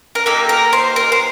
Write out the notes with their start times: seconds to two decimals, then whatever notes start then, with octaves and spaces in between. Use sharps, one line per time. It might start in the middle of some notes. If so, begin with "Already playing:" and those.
0.15 A#4
0.26 A#3 D#4 G4 A4
0.49 A#4
0.73 C5
0.96 A#4
1.12 C5